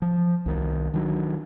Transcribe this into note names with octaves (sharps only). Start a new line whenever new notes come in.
F3
C2 D#3
D#3 F#3 D4